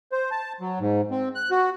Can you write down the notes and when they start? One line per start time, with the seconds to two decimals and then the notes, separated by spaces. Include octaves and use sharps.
0.12 C5
0.31 A5
0.61 F#3
0.79 G#2
1.11 C4
1.35 F#6
1.51 F#4